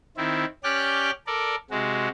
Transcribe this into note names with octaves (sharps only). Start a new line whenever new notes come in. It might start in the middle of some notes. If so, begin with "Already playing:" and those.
D#3 C4 E4
C#4 G4 D5 G5 F6 F#6
A4 A#4 D5
C3 G#3 F#4